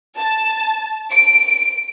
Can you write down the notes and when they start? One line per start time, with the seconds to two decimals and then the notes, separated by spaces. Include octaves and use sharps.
0.18 A5
1.12 D7